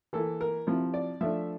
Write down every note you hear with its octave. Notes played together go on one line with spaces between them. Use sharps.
E3 A#3 E4 A4
A#4
C3 F3 C4 E4
D5
F3 A3 D4 E5